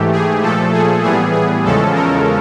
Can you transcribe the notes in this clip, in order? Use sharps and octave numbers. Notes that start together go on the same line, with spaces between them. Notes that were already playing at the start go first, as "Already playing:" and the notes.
Already playing: G#2 E3 A3 G4
G#4
A#2 F3 A3 A4
G#4
A2 E3 G3 B3 G#4
G#4
E2 C#3 F3 G#3 C#4 A4
A#4